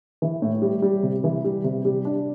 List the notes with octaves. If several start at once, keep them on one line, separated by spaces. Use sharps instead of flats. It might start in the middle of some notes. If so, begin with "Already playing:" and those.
E3
A2
G3
G3
C3
E3
G3
C3
G3
D4